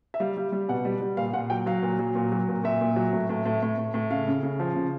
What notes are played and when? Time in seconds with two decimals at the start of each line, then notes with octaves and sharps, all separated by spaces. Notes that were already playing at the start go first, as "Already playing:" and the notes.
0.14 E5
0.20 G3 F5
0.37 G3
0.52 G3
0.69 B2 F#5
0.85 G3
1.01 G3
1.17 A#2 F5
1.33 A#2 F#5
1.50 F#3 G5
1.66 F#3 F5
1.83 A#2
1.99 F#3
2.15 A#2
2.32 F#3
2.48 A#2
2.64 A#2 E5
2.81 A#2
2.96 F#3
3.13 A2
3.29 A2
3.46 A2
3.63 A2
3.78 A2
3.94 A2
4.11 C#3 F5
4.28 C#3
4.43 C#3
4.60 F3
4.76 C#3